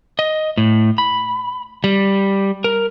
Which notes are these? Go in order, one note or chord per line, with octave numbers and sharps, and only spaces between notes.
D#5
A2
B5
G3
A#4